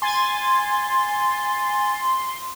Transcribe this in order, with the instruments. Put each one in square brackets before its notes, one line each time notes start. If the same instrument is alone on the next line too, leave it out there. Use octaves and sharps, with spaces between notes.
[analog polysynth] G#5 A6 [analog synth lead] C6